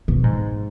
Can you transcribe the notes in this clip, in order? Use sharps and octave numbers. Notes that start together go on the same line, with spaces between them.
B2
G#2